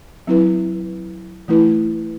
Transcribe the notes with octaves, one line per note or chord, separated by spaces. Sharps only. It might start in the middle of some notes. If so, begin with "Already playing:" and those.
F#3 C4 E4 B4
E3 A3 E4 B4